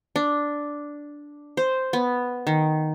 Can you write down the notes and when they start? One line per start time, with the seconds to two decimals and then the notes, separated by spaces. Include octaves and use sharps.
0.16 D4
1.57 C5
1.93 B3
2.47 D#3